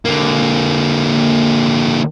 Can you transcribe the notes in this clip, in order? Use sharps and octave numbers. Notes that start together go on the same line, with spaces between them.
D3 A#3